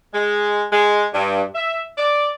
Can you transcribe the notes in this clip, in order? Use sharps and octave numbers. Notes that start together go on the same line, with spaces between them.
G#3
G#3
G2
E5
D5